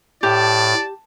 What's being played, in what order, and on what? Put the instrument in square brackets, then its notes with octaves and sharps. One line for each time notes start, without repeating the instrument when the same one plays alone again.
[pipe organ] A2 [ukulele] G4 [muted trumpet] D5 [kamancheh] A5